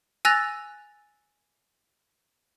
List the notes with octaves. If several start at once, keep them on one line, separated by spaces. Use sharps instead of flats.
G#5 E6 F#6 A6 A#6 F7